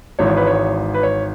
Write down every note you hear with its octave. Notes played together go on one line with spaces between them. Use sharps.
G#1 G#2 E3 C#5
B4
C#5
B4
C#5